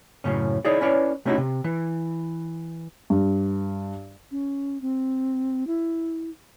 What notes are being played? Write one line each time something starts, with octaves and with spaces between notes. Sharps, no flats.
F#2 A2 C#3 C#4
D#4 E4 G#4 C#5 D5
C#4 E4 B4 C#5 D5
C3 A3 C#4 D#4 E4 F#4
C3
E3
G2
C#4
C4
E4